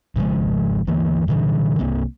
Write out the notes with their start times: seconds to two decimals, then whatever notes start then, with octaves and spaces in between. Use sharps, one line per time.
0.16 G#1 C#3 F3 G#3
0.87 D2 E3 A#3
1.28 G2 A#2 D3 E3
1.79 C2 A#3 C4